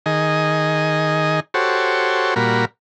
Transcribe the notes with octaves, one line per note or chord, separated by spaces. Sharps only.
D#3 G#4 D#5
F#4 G4 A4 C5 C#5
A#2 G3 F#4 A#4 B5